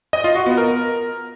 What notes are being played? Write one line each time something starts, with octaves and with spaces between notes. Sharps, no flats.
D#5
F4
F#4
B3
A#4